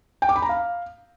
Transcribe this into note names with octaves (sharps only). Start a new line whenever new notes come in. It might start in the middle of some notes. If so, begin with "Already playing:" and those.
G5
D6
B5
A#5
F5